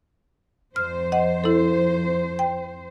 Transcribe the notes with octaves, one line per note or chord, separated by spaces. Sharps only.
F2 C5 F6
D#5 F#5
E4 A4
G5